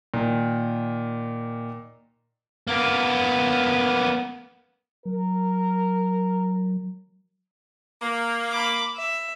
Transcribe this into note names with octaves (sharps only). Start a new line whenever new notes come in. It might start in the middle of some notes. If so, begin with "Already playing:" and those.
A#2 D#3
A#3 B3
F#3 A#4
A#3
B5 D6
E5